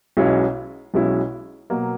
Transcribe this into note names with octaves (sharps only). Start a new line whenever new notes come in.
B1 B2 G#3 C#4 E4
B1 B2 G#3 C#4 E4
B2 F#3 A#3